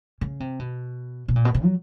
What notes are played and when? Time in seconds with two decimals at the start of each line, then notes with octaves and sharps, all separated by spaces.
0.21 C#3
0.40 C3
0.59 B2
1.28 B2
1.36 A#2
1.45 B2
1.54 C3
1.64 F#3